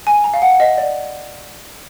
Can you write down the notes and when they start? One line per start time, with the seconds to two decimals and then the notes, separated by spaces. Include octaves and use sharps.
0.07 G#5
0.24 A#5
0.34 F5
0.42 F#5
0.60 D#5
0.78 D5